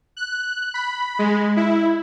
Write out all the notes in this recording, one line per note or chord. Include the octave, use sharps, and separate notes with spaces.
F#6
B5
G#3
E4